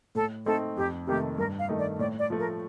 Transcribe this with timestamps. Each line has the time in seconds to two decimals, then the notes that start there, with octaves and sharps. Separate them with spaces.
0.15 A2 A4
0.46 A3 C4 D#4 A4
0.77 F2 G4
1.07 C3 D#3 A3 G4
1.38 G2 A#4
1.59 F5
1.69 D#3 A3 D#4
1.79 D5
1.99 A2 D5
2.19 D5
2.30 F3 A3
2.39 A#4